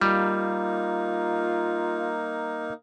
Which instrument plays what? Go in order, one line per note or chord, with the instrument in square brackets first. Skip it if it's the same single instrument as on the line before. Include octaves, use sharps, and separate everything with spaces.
[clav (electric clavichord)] G3 [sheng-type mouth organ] A#3 D#4 [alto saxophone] F4